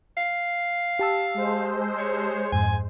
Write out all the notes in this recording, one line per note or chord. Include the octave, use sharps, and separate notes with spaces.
F5
G4 A5 E6
G#3 C5
C#5
F2 G#2 G#5